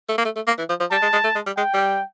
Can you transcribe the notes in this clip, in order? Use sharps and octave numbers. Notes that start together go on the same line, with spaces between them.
A3
A#3
A3
A3
A#3
E3
F3
F3
G3 A5
G#3
G#3
A3
G#3
G3
G#3 G5
G3